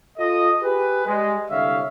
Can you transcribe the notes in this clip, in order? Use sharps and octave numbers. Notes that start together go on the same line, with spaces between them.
F4 A4 D#5
G4 G#4 B4
G3 G#3
C2 D3 C#5 E5 F5